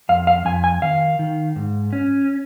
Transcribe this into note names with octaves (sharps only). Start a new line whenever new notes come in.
F2 F5
F5
F2 G#5
G#5
D#3 F5
D#3
G#2
C#4